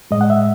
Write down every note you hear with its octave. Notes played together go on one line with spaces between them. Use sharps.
A2 G#3 D#5
F#5
E5